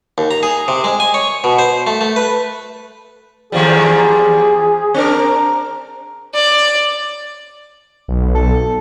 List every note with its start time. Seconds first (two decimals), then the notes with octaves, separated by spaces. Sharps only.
0.18 D#2
0.31 A#5
0.43 G#4
0.68 C3
0.84 G#3
1.00 G#5
1.14 C#5
1.44 B2
1.59 C5
1.87 A3
2.01 A3
2.16 B4
3.52 D#2 F3 G3 G#4
4.94 C4 D4 A#4
6.35 D5
8.08 B1
8.35 A4